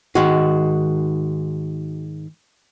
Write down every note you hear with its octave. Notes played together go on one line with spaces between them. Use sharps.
G#2 D#3 G#3 F#4